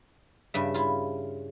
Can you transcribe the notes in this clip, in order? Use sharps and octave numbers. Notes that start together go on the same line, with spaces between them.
G2 C#3 E5
E4 F4